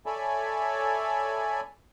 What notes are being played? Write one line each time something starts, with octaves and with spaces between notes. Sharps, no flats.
A4 C#5 D5 E5 G#5 B5